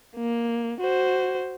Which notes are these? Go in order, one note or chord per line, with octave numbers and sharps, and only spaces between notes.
A#3
F#4 C5